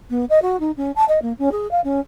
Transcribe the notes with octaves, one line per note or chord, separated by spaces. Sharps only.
B3
D#5
F#4
D#4
C#4
A5
D#5
A#3
C#4
G#4
F5
C#4